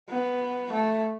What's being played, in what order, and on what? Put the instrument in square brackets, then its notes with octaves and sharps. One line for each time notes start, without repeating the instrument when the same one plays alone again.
[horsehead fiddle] B3
A3